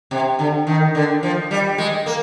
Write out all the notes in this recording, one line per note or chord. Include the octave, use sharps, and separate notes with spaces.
C3
D3
D#3
D3
F3
G3
G#3
A#3